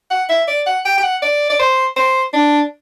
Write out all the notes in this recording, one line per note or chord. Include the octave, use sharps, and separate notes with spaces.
F#5
E5
D5
F#5
G5
G5
F#5
D5
D5
C5
C5
D4